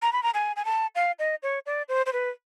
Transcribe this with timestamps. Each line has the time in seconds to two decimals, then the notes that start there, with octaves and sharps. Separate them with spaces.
0.02 A#5
0.13 B5
0.23 A#5
0.34 G#5
0.56 G#5
0.65 A5
0.95 F5
1.19 D#5
1.43 C#5
1.66 D5
1.89 C5
2.06 C5
2.13 B4